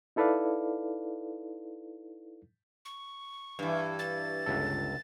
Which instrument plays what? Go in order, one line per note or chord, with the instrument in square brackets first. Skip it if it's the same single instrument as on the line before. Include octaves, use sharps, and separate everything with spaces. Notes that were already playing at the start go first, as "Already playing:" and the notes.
[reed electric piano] D#4 E4 A4 B4 D5 F5
[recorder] C#6
[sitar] G2 E3
[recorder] A6
[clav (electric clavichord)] G1 C#2 A4